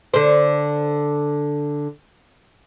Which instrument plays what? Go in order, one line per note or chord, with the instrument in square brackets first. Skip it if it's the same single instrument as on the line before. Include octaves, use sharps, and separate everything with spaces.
[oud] D3 C5